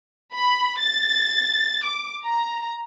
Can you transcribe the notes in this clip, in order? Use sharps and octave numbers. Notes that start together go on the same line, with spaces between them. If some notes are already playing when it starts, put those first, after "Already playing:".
B5
A6
D6
A#5